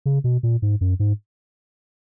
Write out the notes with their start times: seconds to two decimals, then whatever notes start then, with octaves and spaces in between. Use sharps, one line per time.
0.06 C#3
0.24 B2
0.43 A#2
0.62 G#2
0.81 F#2
1.00 G#2